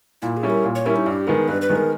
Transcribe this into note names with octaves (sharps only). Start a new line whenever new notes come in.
A#2 E4
G#4
G3 C#4 E4
A#4
A#2
C#5
G3 C#4 E4 A#4
D#4
G2 G4
D#3 G#3 B3 A#4
G2 B4
B4
D#3 G#3 B3
A#4